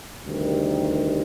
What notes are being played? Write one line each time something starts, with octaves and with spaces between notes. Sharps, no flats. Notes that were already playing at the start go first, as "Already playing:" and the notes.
D2 C3 D#3 G3